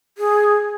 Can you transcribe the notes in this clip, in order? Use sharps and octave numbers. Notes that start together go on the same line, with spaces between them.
G#4